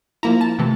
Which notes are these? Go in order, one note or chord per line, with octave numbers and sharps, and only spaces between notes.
F3 A#3 E4 A#5
A5
C3 E3 A3